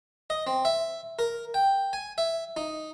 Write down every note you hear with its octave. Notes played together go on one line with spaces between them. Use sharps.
D#5
C4
E5
A#4
G5
G#5
E5
D#4